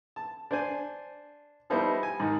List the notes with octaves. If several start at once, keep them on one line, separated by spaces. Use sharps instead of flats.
A5
D4 C5 G#5
F3 G3 B3 D#4 E4 C5
G#5
G#2 D#3